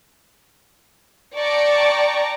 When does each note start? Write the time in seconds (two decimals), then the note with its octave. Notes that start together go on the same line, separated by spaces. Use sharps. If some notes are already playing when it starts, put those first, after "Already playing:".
1.36 D5 G5 A5 A#5 C#6 D6